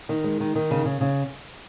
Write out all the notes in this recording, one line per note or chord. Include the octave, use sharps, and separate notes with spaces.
D#3
G#3
D#3
D#3
C#3
C#3
C#3